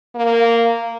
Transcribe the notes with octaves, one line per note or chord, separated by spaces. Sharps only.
A#3